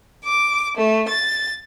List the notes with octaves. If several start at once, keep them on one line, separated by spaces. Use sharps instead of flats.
D6
A3
A6